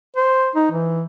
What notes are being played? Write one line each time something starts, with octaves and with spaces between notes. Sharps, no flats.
C5
D#4
E3